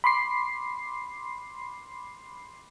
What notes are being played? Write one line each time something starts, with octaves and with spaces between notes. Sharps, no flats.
B5 C6 D6 C7